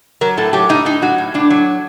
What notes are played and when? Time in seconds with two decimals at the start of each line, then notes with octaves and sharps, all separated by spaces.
0.21 F#3 A#4
0.37 A2 A4
0.53 F#3 G4
0.69 A2 D#4
0.85 A2 D#4
1.02 F#3 F#4
1.18 A2
1.34 A2 D4
1.50 F#3